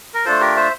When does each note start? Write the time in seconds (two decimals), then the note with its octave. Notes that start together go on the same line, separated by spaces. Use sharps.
0.14 A#4
0.25 A3 D4 F4 A4 C5
0.41 G4 A#4
0.56 C5 E5